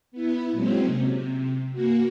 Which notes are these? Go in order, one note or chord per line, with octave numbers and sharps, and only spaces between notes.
B3 E4
A#2 F#3 G#3 C4 C#4
C3
A#3 F#4